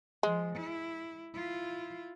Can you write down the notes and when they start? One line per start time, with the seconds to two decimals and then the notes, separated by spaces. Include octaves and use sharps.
0.23 F3 G#3
0.56 E4
1.34 E4 F4